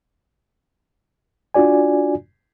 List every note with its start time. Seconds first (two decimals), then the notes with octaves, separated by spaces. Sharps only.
1.54 D4 F4 F#4 D5 G#5